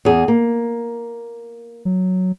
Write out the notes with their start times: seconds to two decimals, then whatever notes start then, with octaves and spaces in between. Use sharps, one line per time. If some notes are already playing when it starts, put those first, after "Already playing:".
0.05 E2 G#4
0.28 A#3
1.85 F#3